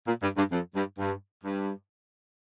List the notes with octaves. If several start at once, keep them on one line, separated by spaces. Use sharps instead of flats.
A#2
G2
G2
F2
G2
G2
G2